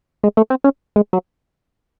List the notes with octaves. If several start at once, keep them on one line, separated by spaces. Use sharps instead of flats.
G#3
A3
C4
C#4
G#3
F#3